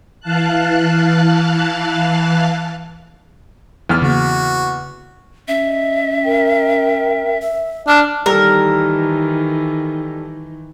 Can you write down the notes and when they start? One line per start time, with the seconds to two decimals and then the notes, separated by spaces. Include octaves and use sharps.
0.20 E3 F5 A5 F#6
3.89 E2 F6
4.02 C#3 A#3 F#4
5.48 C#4 E5
5.65 D#5
6.23 A#4 G5
7.42 E5
7.88 D4 F6
8.26 D#3 E3 G3 A4 A#4